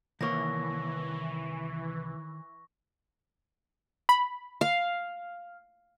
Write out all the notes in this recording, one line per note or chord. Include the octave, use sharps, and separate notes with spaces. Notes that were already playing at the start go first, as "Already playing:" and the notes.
C2 D#3 E3 A#3 C#5 C#6 A#6
B5
F5